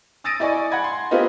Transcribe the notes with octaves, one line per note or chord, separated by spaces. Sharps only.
D#6 E6 A6 A#6 D7 D#7
E4 D5 D#5 G#5 C#6
F#5 G#5 B5 G#6
C6
B3 C4 F4 G4 A#4 D#5